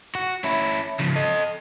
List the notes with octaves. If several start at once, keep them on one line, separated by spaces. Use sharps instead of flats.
F#4
C#4 E4
C#3 F3
A4 D#5